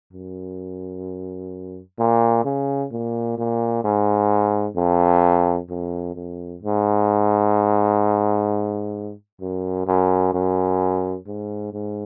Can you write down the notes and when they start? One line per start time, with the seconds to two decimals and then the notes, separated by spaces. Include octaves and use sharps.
0.13 F#2
1.99 A#2
2.45 C#3
2.92 A#2
3.38 A#2
3.84 G#2
4.76 F2
5.70 F2
6.15 F2
6.62 G#2
9.41 F#2
9.87 F#2
10.34 F#2
11.27 G#2
11.73 G#2